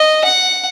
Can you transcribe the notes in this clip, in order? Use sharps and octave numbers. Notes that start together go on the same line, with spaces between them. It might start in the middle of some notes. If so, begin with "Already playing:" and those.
Already playing: D#5
F#5